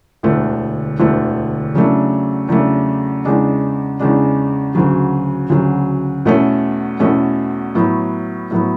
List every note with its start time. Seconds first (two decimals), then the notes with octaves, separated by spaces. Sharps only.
0.23 E1 D2 D3 A3
0.99 E1 D2 D3 A3
1.75 E2 C#3 F#3 A3 D4
2.49 E2 C#3 F#3 A3 D4
3.25 E2 C#3 G#3 D4
3.99 E2 C#3 G#3 D4
4.75 D2 C#3 F#3
5.50 D2 C#3 F#3
6.25 E2 B2 A3 C#4
7.00 E2 B2 A3 C#4
7.75 A2 F#3 B3
8.51 A2 F#3 B3